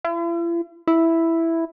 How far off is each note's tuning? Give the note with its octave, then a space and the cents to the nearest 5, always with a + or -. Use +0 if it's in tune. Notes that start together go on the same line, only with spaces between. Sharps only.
E4 +45
E4 +0